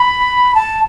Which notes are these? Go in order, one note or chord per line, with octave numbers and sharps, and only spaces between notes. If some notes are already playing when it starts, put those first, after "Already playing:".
Already playing: B5
A5